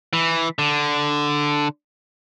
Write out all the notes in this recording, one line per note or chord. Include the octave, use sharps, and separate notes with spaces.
E3
D3